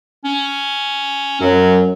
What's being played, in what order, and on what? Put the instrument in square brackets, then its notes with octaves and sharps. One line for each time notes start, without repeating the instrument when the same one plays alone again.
[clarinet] C#4
[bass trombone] F#2 [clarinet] F#3